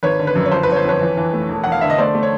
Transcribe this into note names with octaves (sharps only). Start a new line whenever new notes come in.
G#1 B4 C#5
D3
B4
F#2
C#5
G1 C5
B4
G1 C#5
C5
F2 B4 C#5
E3
E3
A3
E1
E1 F#5
F5
D3 E5
D#5
A3 C5 D5
A3
C#5